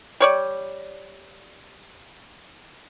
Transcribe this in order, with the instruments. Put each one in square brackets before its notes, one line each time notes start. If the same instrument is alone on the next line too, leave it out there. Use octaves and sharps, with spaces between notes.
[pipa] G3 C#5 D5